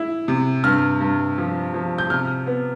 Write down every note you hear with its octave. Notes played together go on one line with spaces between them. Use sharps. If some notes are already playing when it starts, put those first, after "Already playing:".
Already playing: E4
C3
G2 F6
G2
F3
F3
G6
C3 F6
B3